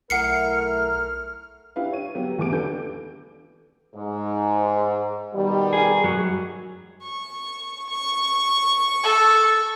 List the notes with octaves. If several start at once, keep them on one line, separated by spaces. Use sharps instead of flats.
B1 A3 E4 A#4 F#5 F6 C7 C#7
D4 E4 G4 B4 F5
C#5 D#7
F#3 B3 G4
A1 E2 B3 D6 D7
D#2 D3 D4 A4 B4 G6
G#2
B2 D#3 G3
G#4
F#2 F#3
C#6
C#6
A4